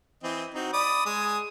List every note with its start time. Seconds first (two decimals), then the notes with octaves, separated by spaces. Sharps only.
0.23 E3 C4 D#5
0.54 C4 D#4 F#4
0.73 D5 B5 D#6
1.06 G#3 G#5 D#6